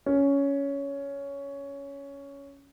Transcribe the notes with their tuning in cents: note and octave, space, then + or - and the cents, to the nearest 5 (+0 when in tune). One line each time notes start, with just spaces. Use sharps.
C#4 +10